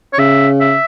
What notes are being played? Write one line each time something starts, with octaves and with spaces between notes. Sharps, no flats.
C#5
C#3 E5
E5